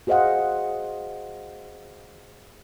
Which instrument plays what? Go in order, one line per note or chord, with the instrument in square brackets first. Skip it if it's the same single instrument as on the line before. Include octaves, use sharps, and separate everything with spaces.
[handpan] F#4 G#4 C5 D#5 F5 F#5